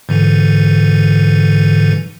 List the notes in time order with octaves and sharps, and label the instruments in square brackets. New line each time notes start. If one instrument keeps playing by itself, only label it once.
[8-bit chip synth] G#2 D3 E3